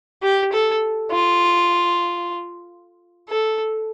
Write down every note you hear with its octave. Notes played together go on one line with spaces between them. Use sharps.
G4
A4
F4
A4